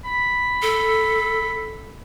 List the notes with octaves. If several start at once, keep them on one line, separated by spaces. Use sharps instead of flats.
B5
A4